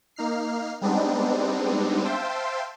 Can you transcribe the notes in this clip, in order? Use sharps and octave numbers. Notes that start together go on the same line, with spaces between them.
A#3 D#4 F6 C7
G3 G#3 B3 C4 D4 D#4
C5 E5 F5 G5 A5 C6